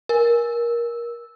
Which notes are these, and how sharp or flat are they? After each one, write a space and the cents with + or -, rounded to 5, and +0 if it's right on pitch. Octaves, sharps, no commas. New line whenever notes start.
A#4 +20